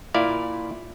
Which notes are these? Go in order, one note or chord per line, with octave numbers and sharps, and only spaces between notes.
A#2 E4 D5 F5